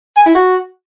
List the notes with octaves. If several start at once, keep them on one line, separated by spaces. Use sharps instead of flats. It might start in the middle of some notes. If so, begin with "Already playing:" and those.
G#5
E4
F#4